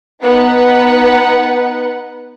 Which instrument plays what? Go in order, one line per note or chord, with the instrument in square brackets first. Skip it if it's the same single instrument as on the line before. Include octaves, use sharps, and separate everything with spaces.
[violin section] B3 D#4 B4 F#5